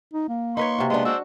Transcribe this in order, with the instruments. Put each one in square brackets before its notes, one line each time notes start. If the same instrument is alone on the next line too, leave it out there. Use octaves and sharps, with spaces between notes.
[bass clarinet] D#4
A#3
[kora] D#4 B4 C#5 [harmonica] C6 C#6
[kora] C3 F#4
[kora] G#3 D4 [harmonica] B3 C6
[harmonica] D4 C5 E6 [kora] F#4